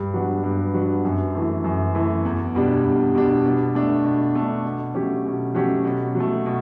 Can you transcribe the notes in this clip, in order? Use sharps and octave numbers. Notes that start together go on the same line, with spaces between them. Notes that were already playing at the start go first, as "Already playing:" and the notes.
Already playing: G2
F#3 B3 D4
G2
F#3 B3 D4
F#2
E3 A3
F#2
E3 A3
E2
B2 G3 D4
E2
B2 G3 D4
B2
A3 D4
B2
A3 D4
B2
F#3 A3 C#4 G4
B2
F#3 A3 C#4 G4
B2
F#3
A3
B2